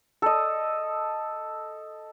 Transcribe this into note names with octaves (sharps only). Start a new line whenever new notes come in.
A4 D#5